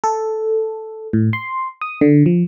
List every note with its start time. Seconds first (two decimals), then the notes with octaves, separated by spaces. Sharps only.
0.04 A4
1.13 A2
1.33 C6
1.81 D#6
2.01 D3
2.26 F3